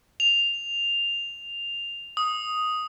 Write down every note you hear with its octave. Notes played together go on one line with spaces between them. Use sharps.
F7
D#6